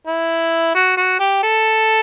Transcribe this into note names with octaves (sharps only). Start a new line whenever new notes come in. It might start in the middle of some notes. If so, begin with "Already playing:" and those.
E4
F#4
F#4
G4
A4